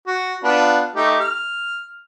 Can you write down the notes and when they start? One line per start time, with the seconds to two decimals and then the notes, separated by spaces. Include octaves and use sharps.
0.07 F#4
0.44 B3 D4 F4
0.96 A3 D#4 G4
1.20 F6